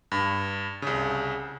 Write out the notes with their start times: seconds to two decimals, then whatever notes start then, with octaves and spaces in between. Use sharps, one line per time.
0.12 G2
0.82 C2 C#3